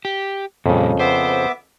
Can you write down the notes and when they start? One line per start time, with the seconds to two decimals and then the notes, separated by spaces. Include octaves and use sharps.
0.05 G4
0.66 F2 A#2 C#3 G3
1.00 B3 C5 E5 D6